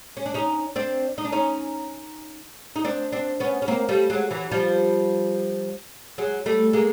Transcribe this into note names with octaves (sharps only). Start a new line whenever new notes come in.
C#4
D4
C#4 D#4
C4 D4
D#4
D4
C#4 D#4
D#4
C4 D4
C4 D4
B3 C#4
C#4
A#3 C4
G3 A3
F#3 G#3
E3 F#3
F3 G3
F#3 G#3
G3 A3
G#3 A#3